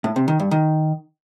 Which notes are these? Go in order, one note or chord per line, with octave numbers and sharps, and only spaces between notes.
A2
C3
D#3
G2
D#3